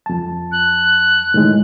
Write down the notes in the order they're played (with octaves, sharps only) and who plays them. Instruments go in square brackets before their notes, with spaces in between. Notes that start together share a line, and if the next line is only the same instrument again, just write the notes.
[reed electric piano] F2 A5
[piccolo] F#6
[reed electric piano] A2 D#3 G#3